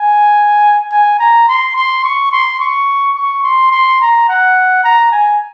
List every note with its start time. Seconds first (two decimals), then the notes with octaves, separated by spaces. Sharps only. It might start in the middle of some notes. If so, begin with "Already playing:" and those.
Already playing: G#5
0.92 G#5
1.19 A#5
1.48 C6
1.76 C6
2.04 C#6
2.32 C6
2.60 C#6
3.15 C#6
3.43 C6
3.72 C6
4.01 A#5
4.29 F#5
4.84 A#5
5.12 G#5